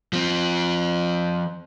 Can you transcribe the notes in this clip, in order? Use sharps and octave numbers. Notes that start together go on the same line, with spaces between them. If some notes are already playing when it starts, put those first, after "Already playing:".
F3 C4